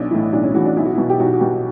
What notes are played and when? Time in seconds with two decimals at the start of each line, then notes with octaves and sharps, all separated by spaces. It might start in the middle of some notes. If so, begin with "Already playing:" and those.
Already playing: B1 D4
0.11 A2 E3 E4
0.33 B1 D4
0.43 C#4
0.49 E4
0.54 A2 E3 F#4
0.65 D4
0.77 B1 E4
0.85 F#4
0.94 B2 E4
1.09 G4
1.20 B1 F#4
1.33 F#4
1.41 B2 G4